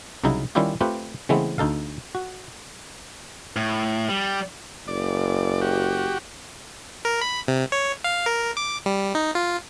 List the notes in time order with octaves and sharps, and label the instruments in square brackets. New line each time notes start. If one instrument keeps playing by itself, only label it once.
[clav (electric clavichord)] C2 C#3 F#3 D#4 E4
D#3 G3 C#4 E4 F4 G4
A3 C4 F4 G4 B4
C#3 E3 G#3 A3 B3 C4
D2 D#4 A4 F5
F#4
[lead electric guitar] A2
G3
[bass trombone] F#1 [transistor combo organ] D5
[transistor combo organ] F#4 G4
[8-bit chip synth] A#4
B5
C3
C#5
F5
A#4
D6
G3
D#4
F4